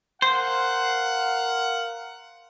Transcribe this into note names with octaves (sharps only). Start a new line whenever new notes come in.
A#4 C5 F5 F#5